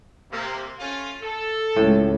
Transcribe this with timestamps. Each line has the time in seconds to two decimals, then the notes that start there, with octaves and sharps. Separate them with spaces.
0.31 C3 A#3
0.79 A3 C#4 F4
1.22 A4
1.76 C#2 A2